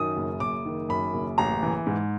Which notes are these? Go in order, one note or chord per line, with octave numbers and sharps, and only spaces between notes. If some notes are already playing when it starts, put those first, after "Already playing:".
Already playing: F#2 D#3 D#6
F#1
F#1 D6
D#3
F#2 B5
F#1
A1 A#5
E3
G#2